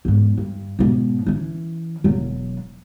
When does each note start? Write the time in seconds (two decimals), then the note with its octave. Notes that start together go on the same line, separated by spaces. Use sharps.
0.05 E2 G#2
0.38 G2
0.79 G#2 B2
1.27 E3 C#4
2.04 E1 F#3